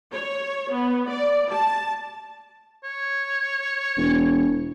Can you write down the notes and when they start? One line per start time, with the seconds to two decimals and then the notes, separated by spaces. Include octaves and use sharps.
0.13 C#5
0.73 B3
1.10 D5
1.51 A5
2.84 C#5
3.98 E1